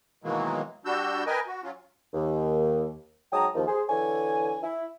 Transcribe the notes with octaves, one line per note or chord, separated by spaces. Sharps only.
B2 D#3 E3 F#3 G#3 A#3
G3 D4 F#4 E6 G6
A#4 B4 D#5 G5 G#5
F#4
F#3 C#4 F4
D#2
G#2 F#3 G5 A5 A#5 D#6
D#2 F3
G#4 C5
D3 E3 C#5 G#5
E4